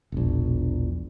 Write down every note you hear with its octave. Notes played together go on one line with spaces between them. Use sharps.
E1 A#1